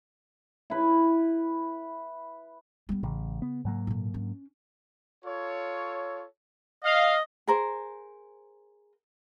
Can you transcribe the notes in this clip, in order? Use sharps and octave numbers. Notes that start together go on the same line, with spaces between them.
E4 B4
G3 B3
A1 C#3
B3
G#2 F#3 A#3
A#2 D3
C#4 D4
F4 A4 C#5
D#5 F5
G#4 A#4 C5